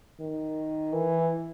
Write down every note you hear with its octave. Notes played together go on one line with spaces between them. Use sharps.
D#3
E3